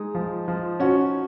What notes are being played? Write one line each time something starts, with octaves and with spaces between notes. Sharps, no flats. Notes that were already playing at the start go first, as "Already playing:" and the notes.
Already playing: G#3 D#4
F3
F3
C#4 F#4